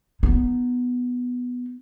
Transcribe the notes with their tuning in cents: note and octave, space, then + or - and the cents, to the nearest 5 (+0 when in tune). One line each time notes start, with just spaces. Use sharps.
B3 +0 D#4 -15